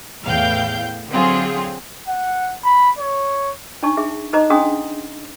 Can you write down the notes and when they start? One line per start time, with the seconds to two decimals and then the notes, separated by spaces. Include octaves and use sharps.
0.23 E2 A2 F5 G5 G6
1.10 D3 F#3 C4 F4 G#4
2.08 F#5
2.64 B5
2.99 C#5
3.83 D4 D#4 C#5 A5 C#6
3.97 G#4 E5
4.33 D#4 A4 C5 D#5 A#5
4.50 C#4 D4 G#4 F#5 C6 D#6